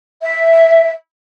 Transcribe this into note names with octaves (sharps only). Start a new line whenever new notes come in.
E5